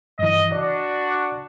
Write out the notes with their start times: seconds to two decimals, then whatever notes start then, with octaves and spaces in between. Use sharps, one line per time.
0.19 G2 E3 D#5
0.52 D4 F#4 D5